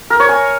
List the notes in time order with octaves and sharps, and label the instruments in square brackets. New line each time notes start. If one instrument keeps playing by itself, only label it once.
[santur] A#4
C#5
G#5